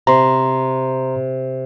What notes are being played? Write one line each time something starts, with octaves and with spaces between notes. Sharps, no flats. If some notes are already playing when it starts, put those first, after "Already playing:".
C3 A#5 C6